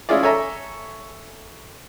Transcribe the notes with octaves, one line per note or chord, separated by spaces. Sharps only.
G#3 C#4 E4 F4 G#4 D5
A4 C#5 E5 G#5 A#5